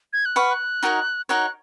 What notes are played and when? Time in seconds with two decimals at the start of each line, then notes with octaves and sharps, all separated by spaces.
0.13 G#6
0.25 F#6
0.36 B4 F#5 C#6 F6
0.51 F#6
0.83 D#4 F#4 A#4 C#5
1.29 D#4 F#4 A#4 C#5 F#6